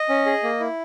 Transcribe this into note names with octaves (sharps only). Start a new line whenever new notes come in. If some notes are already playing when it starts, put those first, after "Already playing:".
Already playing: D#5
C#4
G#4
A#3
E4